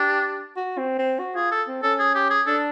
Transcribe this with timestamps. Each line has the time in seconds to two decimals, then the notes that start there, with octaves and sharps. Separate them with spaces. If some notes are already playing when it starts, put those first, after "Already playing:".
Already playing: D4 G4
0.56 F#4
0.78 C4
0.99 C4
1.19 F#4
1.36 F4 G#4
1.52 A4
1.68 C4
1.83 C#4 A4
1.99 G#4
2.15 G4
2.30 G#4
2.47 D4 A4